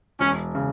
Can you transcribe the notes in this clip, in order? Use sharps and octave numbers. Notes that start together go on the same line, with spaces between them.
E1 C#4
C#3